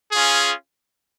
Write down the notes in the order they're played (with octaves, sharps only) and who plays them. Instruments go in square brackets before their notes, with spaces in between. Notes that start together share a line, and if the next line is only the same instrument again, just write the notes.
[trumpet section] C#4 F4 G#4